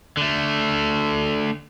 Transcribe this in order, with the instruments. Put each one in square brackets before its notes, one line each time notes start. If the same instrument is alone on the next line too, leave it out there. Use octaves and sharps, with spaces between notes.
[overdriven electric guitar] D3 A3